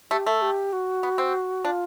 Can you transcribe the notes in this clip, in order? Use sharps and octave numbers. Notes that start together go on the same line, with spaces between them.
A3 G4
A3 A4
G4
F#4
B3
C4
D4 F4